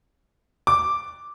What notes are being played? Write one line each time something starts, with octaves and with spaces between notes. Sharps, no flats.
D6